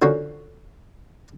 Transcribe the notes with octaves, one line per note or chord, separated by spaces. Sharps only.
D3 F3 A#3 C#4 F#4